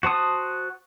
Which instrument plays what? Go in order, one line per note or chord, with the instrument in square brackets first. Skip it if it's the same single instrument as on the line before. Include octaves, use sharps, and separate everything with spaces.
[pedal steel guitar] F#4 C5 A5 D#6